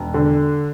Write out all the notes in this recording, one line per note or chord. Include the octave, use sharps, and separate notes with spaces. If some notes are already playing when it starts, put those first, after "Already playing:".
Already playing: E1
D3